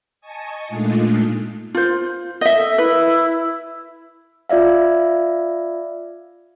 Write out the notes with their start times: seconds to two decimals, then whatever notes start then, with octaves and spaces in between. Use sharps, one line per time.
0.21 D#5 G#5 A5 C#6 D#6
0.68 A#2 G#3 A3 D4 D#4 F4
1.75 F4 C5
2.41 D#5 E5
2.55 A4
2.78 E4 B4
4.49 F4 D5 E5 F5